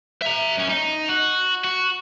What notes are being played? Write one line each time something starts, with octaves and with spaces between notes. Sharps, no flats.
E5 A#5
F#2 C#4
D#4
F#4
F#4